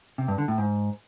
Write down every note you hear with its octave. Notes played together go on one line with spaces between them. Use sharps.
C3
G2
D3
A2
G#2